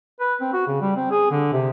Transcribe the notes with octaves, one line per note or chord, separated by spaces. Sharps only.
B4
C4
F#4
C#3
G3
C4
G#4
D3
C3